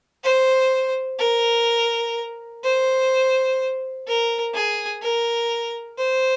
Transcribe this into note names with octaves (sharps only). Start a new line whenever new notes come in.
C5
A#4
C5
A#4
G#4
A#4
C5